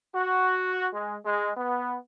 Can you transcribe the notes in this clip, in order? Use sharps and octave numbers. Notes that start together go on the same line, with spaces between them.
F#4
G#3
G#3
B3